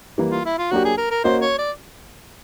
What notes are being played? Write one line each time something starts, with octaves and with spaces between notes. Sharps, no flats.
E3 G3 A#3
F4
E4
F4
F#3 A#3 D4 F#4 G4
G#4
A#4
A#4
A#3 C#4 F#4 A#4 C5 D#5
C#5
D5